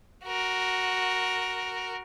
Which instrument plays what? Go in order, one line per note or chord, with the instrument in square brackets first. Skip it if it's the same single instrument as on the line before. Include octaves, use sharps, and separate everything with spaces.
[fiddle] F#4 A#4